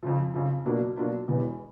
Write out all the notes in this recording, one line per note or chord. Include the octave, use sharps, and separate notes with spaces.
F2 C#3 F3
F2 C#3 F3
B2 F#3 A#3 D4 F4
B2 F#3 A#3 D4 F4
E1 E2 B2 G3 B3